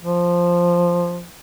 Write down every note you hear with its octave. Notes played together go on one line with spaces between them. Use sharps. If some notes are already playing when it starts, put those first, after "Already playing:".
F3